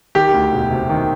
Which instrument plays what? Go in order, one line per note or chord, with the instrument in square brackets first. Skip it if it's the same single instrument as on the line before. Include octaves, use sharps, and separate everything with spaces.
[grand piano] D#3 G4
D2
E1
C3
D#3